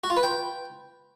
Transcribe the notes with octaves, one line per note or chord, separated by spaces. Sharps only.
F#4
F4
B4
G5